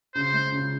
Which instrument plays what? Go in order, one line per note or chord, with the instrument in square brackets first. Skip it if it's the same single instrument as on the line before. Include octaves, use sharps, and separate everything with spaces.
[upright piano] C#3 [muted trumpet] C5
[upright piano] G#3
C#3